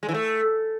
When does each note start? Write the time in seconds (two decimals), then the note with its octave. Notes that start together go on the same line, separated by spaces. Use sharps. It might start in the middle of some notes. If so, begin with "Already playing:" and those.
0.03 G#3
0.09 E3
0.14 A3